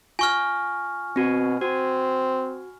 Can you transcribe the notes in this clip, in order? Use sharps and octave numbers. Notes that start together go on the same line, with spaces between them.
F4 G#5 C#6 F6
B2 C4 F#4
C4 F#4